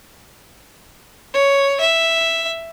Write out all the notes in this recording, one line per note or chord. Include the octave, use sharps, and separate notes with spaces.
C#5
E5